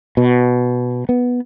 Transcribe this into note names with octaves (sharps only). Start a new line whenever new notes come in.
B2
B3